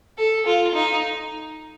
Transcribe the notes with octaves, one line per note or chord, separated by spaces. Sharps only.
A4
F4
D#4